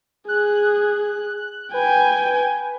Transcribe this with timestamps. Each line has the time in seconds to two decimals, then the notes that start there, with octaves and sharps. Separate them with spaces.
0.28 G#4 F#6
1.74 B4 G5 G#5